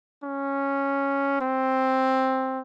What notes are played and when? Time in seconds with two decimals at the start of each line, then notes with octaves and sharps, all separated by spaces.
0.24 C#4
1.41 C4